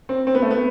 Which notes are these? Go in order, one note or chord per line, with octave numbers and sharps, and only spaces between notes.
C4
C4
B3
A3
B3